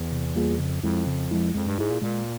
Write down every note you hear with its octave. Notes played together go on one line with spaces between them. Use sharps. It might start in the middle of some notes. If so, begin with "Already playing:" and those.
Already playing: E2
C3
G3 A#3 F4 G#4
F2 C#3
F2 F3 G#3 E4
C#3
F3 G#3 E4
F2 G#3
G2
G#2 E4 G#4
A#2
A#2 G#3